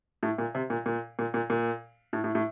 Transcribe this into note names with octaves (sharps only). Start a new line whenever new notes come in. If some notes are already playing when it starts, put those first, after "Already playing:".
A2
A#2
C3
A#2
A#2
A#2
A#2
A#2
A2
A2
A2